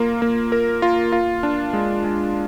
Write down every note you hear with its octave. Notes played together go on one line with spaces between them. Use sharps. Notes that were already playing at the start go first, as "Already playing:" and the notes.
Already playing: A#3 F4 A#4
A#3
A#4
F4
F4
D4
G#3
G#3